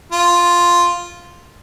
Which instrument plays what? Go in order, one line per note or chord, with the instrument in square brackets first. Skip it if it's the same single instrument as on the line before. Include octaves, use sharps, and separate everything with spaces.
[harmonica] F4